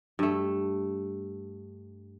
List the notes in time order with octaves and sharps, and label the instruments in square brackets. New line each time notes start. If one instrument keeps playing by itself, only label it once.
[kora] G2 A3